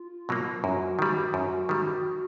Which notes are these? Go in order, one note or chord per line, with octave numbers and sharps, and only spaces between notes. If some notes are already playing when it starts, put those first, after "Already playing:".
Already playing: F4
B2 F#3 A#3
F#2 F#4
D#3 G3
F#2 F#4
D#3 G3